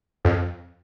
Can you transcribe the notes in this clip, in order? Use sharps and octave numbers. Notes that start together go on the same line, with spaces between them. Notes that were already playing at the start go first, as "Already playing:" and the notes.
F2